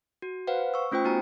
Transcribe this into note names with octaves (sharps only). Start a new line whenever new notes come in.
F#4
B4 C5 F5 F#5
C#6 E6
A3 C#4 F4 C5 G5
B3 D#4 F#4 G#5 A#5